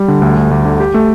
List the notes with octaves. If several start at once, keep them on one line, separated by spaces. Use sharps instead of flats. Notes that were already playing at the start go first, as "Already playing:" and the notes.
Already playing: G3
D3
D2
D2
D2
D3
G4
A3